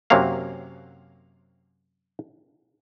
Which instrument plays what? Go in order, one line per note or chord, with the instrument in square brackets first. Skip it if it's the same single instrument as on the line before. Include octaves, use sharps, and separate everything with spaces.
[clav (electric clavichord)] F#2 C3 F#3 A#3 F5